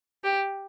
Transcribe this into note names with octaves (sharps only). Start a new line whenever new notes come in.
G4